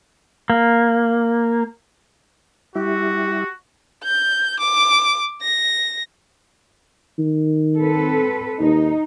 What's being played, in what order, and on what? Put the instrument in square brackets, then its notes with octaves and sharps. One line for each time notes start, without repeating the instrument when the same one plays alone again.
[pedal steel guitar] A#3
[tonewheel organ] G3 E4 [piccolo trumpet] F#4 [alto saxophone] G4
[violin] G6
D6
A#6
[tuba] D#3
[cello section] C4 A4 B4
[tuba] D#2 [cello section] D#4